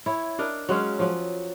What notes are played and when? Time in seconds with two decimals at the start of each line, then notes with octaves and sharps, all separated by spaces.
0.06 E4 C#5
0.39 D4 A#4 D#5
0.69 F#3 G#3 C#4 F5
0.99 F3 F#3